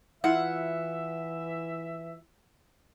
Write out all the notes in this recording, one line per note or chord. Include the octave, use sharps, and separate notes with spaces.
E3 E4 F4 E5 F#5